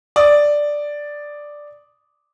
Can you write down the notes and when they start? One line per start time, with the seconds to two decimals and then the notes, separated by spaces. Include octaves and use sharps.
0.16 D5 D#6